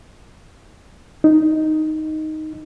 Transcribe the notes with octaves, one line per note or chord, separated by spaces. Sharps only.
D#4